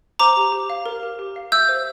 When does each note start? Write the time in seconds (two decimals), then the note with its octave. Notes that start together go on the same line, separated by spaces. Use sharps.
0.19 C5 A#5 D6
0.37 G4
0.52 G4
0.70 F5
0.86 A#4
1.03 G4
1.19 G4
1.36 F5
1.52 E5 E6 G6
1.69 C5